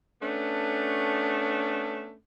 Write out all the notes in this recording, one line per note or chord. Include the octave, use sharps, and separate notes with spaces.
A3 B3 C#4 D4